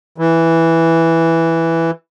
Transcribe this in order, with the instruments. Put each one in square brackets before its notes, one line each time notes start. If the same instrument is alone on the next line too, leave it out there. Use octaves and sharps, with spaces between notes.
[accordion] E3